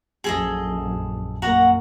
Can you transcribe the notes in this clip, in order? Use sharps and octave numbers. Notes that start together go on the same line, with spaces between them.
A#1 F#2 G#4 A4 D#5
F#2 A#3 F#4 F#5 A#5